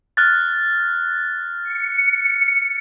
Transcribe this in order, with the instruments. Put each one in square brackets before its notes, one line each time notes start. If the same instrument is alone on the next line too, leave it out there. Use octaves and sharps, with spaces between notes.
[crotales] F6 F#6 A6
[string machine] C#7